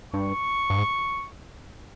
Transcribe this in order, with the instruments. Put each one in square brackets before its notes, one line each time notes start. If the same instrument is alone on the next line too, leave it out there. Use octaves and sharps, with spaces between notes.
[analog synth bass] G2 [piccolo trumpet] C#6
[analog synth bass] G2
G#2